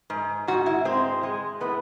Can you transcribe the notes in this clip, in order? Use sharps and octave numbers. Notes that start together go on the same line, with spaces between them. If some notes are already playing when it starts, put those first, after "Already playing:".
G#2
G#2 F#4
E4
G#3 C4
G#3
A2 B3